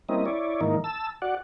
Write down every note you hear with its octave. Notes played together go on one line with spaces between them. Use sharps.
G3 A#3 C4 C#4 E4 D#5
E4 C#5 D5
G#2 D#3 E3 A#3 D#4
A5 E6
F#4 D5 F#5